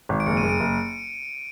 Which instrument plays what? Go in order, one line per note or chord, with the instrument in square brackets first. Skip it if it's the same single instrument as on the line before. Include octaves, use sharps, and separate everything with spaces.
[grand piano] G#1
[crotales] D7
[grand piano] F#1 [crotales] C#7
[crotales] D#7
[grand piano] F#1
[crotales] D7
[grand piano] F#1